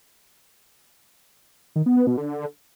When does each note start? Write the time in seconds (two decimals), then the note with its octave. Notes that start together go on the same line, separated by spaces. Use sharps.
1.76 D#3
1.86 B3
1.97 B3
2.07 B2
2.17 D3